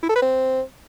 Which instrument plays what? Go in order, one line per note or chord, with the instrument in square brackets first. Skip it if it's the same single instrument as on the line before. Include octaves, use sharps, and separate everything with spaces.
[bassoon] E4
A4
B4
C4